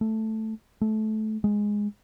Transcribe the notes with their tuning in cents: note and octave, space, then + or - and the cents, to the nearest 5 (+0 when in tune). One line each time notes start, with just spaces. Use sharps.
A3 +0
A3 -20
G#3 -5